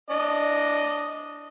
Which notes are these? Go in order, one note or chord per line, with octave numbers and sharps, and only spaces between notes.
D4 D#5